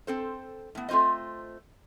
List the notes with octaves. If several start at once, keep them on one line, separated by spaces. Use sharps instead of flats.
C4 A4 C5
A2 B3
A3 C4 F4 C5 D#5